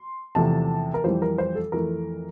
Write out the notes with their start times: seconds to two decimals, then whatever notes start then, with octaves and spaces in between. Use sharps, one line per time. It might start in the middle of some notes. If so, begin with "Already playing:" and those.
Already playing: C6
0.35 E2 C3 F3 A3 A5
0.94 A#4
1.04 F2 E3 G3 C5
1.22 A#4
1.38 C5
1.55 A4
1.72 F2 E3 A3 A#4